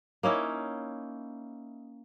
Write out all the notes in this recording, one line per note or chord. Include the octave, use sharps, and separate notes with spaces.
A#3 C#4 D#4 E4